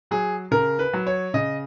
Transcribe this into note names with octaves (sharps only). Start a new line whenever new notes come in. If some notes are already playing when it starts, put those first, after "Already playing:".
F#3 G#4
C#3 A#4
B4
F#3
C#5
C#3 D#5